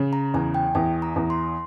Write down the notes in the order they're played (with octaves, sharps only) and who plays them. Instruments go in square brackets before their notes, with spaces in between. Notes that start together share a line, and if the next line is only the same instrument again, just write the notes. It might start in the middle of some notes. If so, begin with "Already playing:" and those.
Already playing: [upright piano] C#3
[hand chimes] A#5
[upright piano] E2 [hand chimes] G#5
[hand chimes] G5
[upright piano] E2 [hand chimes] G#5
[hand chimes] A#5
[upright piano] E2
[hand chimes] C6